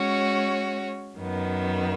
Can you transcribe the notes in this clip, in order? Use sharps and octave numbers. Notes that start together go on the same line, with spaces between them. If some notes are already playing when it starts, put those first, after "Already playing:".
Already playing: G#3 C#4 F#4 C#5
F#2 D#3 B3